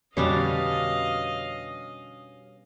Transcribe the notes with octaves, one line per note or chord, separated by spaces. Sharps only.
F2 B2 D3 G3 C#4 D4 D#5 F5